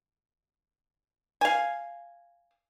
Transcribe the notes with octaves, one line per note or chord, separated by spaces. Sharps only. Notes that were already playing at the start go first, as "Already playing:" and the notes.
F5 G#5